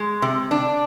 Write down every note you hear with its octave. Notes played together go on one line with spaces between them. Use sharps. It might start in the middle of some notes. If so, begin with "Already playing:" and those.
Already playing: G#3
C3
D4